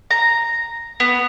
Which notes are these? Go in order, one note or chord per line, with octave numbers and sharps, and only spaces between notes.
A#5
B3